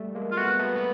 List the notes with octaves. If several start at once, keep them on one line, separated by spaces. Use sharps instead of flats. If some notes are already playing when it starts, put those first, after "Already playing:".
Already playing: G3 A3
G#3 A#3
F4
A3 B3 F#4
A3 B3
B3